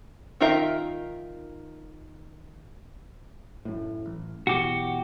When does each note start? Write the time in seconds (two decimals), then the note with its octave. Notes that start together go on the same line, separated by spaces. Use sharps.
0.41 D#3 D#4 F4 A#4 E5
3.65 F#2 A2
4.06 A1
4.47 B1 E2 F#4 G4